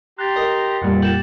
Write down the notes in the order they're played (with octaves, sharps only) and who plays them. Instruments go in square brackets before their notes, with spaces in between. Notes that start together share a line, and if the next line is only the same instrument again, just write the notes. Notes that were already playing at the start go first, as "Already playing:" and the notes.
[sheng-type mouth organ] G4 A#5 C6 [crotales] F#6 A6
[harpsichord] A#4 D#5
[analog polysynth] F2 A#2 G3 [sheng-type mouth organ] F#5
[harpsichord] G4 [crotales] A6 E7 F#7